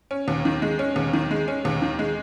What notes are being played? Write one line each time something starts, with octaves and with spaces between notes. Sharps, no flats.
C#4
D#2
D#3
G#3
C#4
D#2
D#3
G#3
C#4
D#2
D#3
G#3